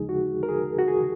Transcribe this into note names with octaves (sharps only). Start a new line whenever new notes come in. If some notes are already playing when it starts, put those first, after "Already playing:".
Already playing: D#2 C#3 F3 G#3 D#4 G#4
F#4
A#4
G#4
F#4
G#4